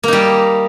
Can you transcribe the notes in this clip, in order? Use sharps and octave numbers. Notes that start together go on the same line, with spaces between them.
G3 A#3 D#4